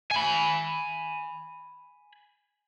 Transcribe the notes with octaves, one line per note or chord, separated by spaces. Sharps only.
G#5 B5